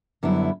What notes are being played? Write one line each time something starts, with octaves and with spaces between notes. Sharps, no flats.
F#2 D3 G3 B3 E4